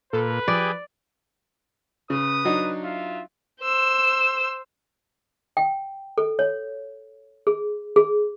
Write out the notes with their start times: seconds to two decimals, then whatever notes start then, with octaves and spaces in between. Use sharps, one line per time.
0.13 A#2 A4 B4
0.48 F3 G4 G#4 D5
2.10 C#3 B4 D#6
2.45 F#3 D4 D#4
2.82 F4 E5 F5
3.62 C5 E6
5.57 G5
6.18 A4
6.39 C#5
7.47 G#4
7.96 G#4